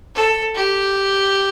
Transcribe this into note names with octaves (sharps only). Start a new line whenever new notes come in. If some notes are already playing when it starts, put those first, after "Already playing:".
A4
G4